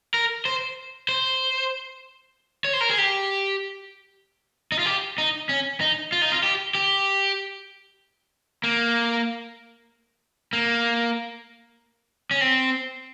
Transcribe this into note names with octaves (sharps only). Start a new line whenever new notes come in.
A#4
C5
C5
C#5
C5
A#4
G#4
G4
D#4
F4
G4
D#4
C#4
D#4
F4
D#4
F4
G4
G4
A#3
A#3
C#4
C4